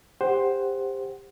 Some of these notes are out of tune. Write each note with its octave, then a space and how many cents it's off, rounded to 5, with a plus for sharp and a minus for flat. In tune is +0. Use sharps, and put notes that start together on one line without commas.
G4 +25 C5 +5 F#5 +10